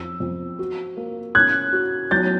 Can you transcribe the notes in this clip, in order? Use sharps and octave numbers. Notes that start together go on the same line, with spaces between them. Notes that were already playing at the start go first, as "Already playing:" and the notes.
Already playing: F2 E6
F2
F#4
A#3
C#4 F#6 G#6
F#4
F#3 G6 A6